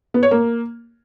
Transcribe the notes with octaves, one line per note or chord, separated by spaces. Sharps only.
B3
C#5
A#3